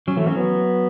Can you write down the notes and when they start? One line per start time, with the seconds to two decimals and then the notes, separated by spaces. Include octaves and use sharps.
0.07 F#3 C#4
0.17 E3 A3
0.27 F#3 C#4
0.37 B3